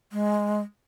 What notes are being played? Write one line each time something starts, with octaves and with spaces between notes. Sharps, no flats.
G#3